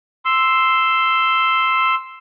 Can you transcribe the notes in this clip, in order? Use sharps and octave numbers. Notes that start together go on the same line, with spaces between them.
C6 E6